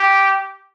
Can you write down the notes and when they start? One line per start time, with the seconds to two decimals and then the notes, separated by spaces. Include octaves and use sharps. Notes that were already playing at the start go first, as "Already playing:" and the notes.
Already playing: G4